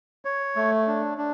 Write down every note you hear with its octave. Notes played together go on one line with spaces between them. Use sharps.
C#5
A3
D4
D4